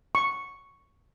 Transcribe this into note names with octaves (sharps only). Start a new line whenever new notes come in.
C#6